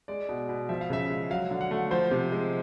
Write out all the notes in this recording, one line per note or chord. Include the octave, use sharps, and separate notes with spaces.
G#3 D5
B2
B2
F3 E5
F5
C#3 E5
G#3
F#3 F5
D3
F#5
A3
F3 C5
C3
G#3